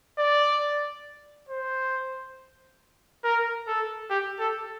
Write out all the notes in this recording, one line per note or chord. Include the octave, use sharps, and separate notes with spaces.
D5
C5
A#4
A4
G4
A4